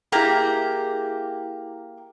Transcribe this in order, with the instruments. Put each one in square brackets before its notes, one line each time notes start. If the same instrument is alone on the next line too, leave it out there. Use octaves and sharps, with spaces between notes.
[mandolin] A#3 G4 A#5 [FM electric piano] E4 G#4